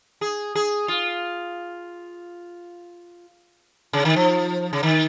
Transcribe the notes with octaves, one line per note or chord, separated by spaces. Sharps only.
G#4
G#4
F4
C#3
D#3
F3
C#3
D#3